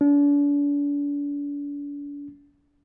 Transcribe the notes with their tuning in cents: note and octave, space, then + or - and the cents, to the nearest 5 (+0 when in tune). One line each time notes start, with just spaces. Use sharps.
D4 -40